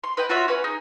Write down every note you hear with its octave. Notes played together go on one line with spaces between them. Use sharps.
C6
B4 D#5 F#5 G5
F4 F#4 C#5 E5
C#4 B4 F#5
D#4 G#4